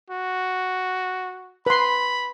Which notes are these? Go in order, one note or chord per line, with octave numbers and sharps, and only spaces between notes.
F#4
B4 B5 C6